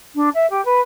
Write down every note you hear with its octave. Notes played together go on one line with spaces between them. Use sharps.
D4
E5
G4
B4